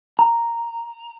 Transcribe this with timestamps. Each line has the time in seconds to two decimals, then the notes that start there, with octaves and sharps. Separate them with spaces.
0.19 A#5